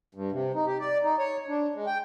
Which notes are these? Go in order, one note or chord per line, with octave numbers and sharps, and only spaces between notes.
G2
C3
D#4
G4
D5
D#4
C#5
D4
G#3
G5